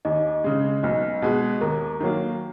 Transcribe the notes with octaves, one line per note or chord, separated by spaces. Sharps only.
D#2 D#4 D#5
C#3 G#3
B1 D#4 D#5
B2 G#3
D#2 A#4 A#5
D#3 F#3 A#3